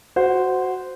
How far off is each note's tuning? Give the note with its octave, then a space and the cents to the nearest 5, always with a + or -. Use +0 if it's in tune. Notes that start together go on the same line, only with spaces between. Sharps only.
F#4 +0 C5 -10